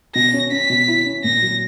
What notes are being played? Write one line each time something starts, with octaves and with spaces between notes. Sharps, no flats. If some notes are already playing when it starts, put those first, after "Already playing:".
B2 A#6
C#4
C#4 B6
B2
E4
C#4
A#2 A#6
F#3